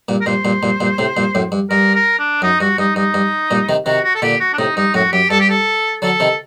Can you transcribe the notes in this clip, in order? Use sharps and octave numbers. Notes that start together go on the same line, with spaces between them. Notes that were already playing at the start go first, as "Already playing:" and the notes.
G2 A#2
A#4
G2 A#2 C5
G2 A#2
G2 A#2
G2 A#2
A2 C3
G2 A#2
F#2 A2
G2
G2 A#4
A#4
D4
F#2 D#4
G2 F#4
G2 D#4
G2 D#4
G2
G2 A#2
C3 D#3
C3 D#3 F#4
F#4
A4
A#2 D3 G4
F#4
D4
A2 C3 D#4
G2 D#4
F#2 A2 F#4
F#2 G4
G2 A4
G4
A4
D3 F#3 A4
C3 D#3